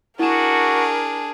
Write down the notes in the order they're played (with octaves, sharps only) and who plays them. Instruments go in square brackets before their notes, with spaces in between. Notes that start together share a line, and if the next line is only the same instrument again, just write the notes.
[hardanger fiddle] D4 G#4 [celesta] E4 E7 [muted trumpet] F#4 [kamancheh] A#4